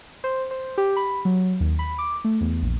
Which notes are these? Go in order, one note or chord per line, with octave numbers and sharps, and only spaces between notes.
C5
C5
G4
B5
F#3
D#2
B5
D6
A3
E2
A#1